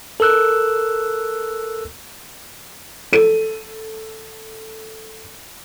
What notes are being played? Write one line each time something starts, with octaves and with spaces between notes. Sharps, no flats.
A4 A#4 E6 F#6
A4 D#7